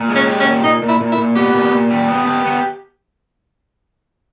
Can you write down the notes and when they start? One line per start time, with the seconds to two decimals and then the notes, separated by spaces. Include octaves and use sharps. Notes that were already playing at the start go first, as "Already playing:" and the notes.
Already playing: A#2
0.09 G#3
0.15 C#4
0.28 G4
0.40 C#4
0.45 A#2
0.63 A#2 D#4
0.82 A#2
0.88 E4
1.00 A#2
1.12 E4
1.17 A#2
1.35 B3 G4
1.54 A#2
1.71 A#2
1.91 G4
2.08 B3
2.25 G4
2.45 B3